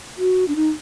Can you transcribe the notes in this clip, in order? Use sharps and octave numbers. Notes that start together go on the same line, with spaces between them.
F#4
D4
D#4